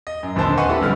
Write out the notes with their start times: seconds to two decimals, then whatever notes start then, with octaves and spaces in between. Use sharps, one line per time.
0.07 D#5
0.23 F#2
0.35 A#1 D#2 D3 C4 C5 A5
0.57 B4 D#5 F#5 G#5 C6 C#6
0.69 D4 E4 G4 A4
0.80 D#1 F2 D3 G3 F6